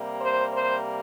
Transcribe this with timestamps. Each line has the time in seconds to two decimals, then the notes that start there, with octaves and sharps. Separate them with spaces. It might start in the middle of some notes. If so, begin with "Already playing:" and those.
Already playing: C3 G3 A#3
0.21 C5
0.53 C5